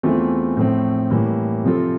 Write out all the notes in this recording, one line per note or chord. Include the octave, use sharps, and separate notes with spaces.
E2 E3 A3 C4 F4
A2 F3 A3 C4
A2 E3 G3 A#3
C3 F3 C4 F4 A4